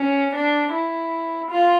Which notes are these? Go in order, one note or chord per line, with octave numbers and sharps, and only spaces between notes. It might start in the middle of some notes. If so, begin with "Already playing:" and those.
Already playing: C#4
D4
E4
F4